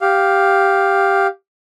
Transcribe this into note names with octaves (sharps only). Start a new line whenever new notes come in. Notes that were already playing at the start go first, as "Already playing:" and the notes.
G4 F5